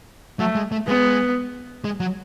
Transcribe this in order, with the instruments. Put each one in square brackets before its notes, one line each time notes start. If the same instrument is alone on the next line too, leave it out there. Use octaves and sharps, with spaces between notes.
[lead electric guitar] F#3 [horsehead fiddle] A3
[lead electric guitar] G#3
A3
[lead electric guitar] G#3 [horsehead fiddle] B3
[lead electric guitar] G#3
F#3